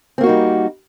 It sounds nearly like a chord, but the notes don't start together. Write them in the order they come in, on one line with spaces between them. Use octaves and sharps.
C4 A#3 F#4 D#4 G3